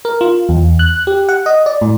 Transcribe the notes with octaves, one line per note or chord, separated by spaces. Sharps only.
A#4
F4
E2
F#6
G4
F#5
D#5
D5
A2